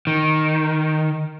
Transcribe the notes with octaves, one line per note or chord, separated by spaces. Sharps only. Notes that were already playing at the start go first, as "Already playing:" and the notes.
D#3